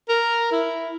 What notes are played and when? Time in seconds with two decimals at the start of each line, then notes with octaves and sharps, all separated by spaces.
0.09 A#4
0.52 E4